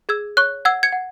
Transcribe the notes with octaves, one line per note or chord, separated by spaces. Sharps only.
G#4 E6 G#6
C#5 C#6 F#6
F#5 E6 G#6
G#6 C#7
F#5